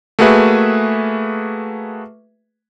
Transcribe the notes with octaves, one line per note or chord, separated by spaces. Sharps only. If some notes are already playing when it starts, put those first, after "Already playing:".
A3 A#3 F#4 G#4 B4 E5